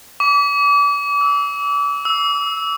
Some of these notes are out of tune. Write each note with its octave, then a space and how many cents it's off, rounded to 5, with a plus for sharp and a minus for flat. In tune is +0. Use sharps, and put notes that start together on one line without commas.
D6 -35
E6 -35
E6 -10